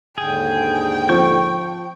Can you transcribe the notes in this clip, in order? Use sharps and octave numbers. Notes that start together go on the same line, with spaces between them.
D#2 G#2 D3 G#4 G5
F3 C4 C#6 G6